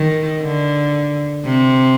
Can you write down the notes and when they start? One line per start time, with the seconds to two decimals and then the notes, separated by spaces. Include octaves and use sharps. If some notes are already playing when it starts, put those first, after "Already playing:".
Already playing: D#3
0.42 D3
1.45 C3